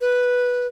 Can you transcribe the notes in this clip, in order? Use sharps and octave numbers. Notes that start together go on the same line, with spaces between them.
B4